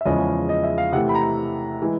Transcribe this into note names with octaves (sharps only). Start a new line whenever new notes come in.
E5
E2 C#3 F3 G#3 C#4 D#5
D#5
E5
F5
C3 E3 A3 F#5
B5
A#5
E3 G#3